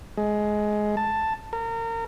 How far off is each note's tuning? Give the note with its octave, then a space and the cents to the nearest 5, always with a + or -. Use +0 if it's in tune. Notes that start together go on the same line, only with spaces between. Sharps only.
G#3 +15
A5 +5
A#4 -30